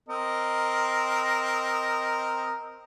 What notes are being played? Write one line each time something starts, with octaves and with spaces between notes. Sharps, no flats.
C4 A#4 D#5